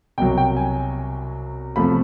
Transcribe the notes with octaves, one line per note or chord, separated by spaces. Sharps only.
C2 B2 F#3 G5
G5
G#5
E2 C3 F3 A3 B5